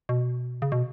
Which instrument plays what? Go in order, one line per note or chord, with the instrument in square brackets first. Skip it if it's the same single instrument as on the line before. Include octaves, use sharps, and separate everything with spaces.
[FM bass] B2
C#3
B2